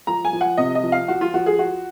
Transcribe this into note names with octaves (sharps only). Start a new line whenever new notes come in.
F3 A#5
G#5
F3
F#5
C3 D#5
D#5
F3
F5
F3 F#4
F4
F3 F#4
G#4
F4 F#4